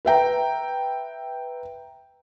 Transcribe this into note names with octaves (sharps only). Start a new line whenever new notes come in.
B4 E5 G5 A#5